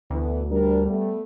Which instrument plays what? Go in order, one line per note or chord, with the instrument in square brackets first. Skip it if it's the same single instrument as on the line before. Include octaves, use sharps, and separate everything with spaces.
[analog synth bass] D2 [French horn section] E3 B3
[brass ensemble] G3 [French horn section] D4 A#4
[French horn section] A3 B3